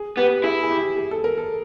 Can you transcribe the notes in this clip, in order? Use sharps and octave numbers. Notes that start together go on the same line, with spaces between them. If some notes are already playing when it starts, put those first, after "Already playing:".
Already playing: G#4
B3 G4
E4 G#4
G#4
G4
G#4
A4
A#4
A4